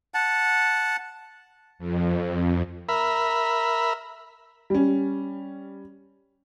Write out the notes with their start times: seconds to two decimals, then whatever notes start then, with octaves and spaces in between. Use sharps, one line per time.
0.14 F#5 A5
1.79 F2
2.89 A#4 E5 B5
4.70 G3 C#4